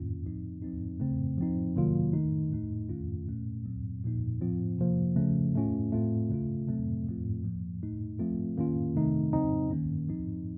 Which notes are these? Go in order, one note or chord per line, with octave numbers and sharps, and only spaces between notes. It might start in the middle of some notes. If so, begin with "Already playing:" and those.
Already playing: D#3 A#3 C#4 F4
A2 F3 C4 D#4
F3 C4 D#4
C#3 A3 C4
F3 C4 D#4
C3 D#3 F#3 A#3 F4
D#3 A3 D#4
A2 A3 D#4
D#3 A3 C#4 F4
A#2 A3 C#4
A#2 F#3 C4
A#2 F3 A#3 D#4
A2 F3 C4 F4
C3 F3 A#3
C#3 F3 A3 C#4
A2 A3 C#4 F4
A2 A3 C4 F4
C#3 A3 C#4 F4
C3 F#3 A3 C4
A2 F3 A3 C4 F4
A2 F3 A#3
A2 A3 D#4
F3 A3 C4 F4
D#3 A#3 C#4 F4
C3 D#3 A3 C4 D#4
C#3 F#3 C4 D#4
D#3 A#3 C#4
F3 C4 D#4